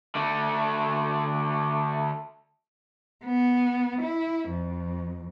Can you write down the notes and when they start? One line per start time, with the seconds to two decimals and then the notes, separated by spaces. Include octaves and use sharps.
0.15 D3 A3
3.24 B3
4.02 E4
4.49 F2